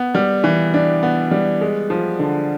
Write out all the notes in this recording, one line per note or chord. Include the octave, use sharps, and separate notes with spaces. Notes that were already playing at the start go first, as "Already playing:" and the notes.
Already playing: B3
G3
E3
D4
B3
G3
G#3
F3
D3